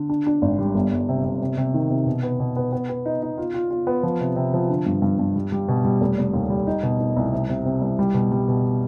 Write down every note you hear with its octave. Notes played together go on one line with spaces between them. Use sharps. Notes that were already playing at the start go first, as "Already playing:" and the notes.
Already playing: D3
D4
D4
G#1
G3
G1
G1
C3
C3
C3
C3
D#3
C3
B2
B3
B2
B3
B3
B3
D#4
D#4
F4
F4
F4
B3
F3
C3
C3
F3
D3
G2
G2
G2
G3
G3
B2
G3
F1
F1
D#2
G3
D#4
B2
D#4
C2
C3
C3
C3
C2
G3
B2
G3
B2